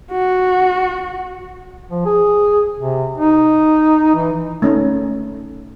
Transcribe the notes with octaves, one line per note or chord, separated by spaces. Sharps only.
F#4
F3
G#4
C3
D#4
E3
A3 C#4 D#4